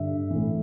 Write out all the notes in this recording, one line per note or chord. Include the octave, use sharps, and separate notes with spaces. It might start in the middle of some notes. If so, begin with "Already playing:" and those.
Already playing: G2 D3 E5
A2 E3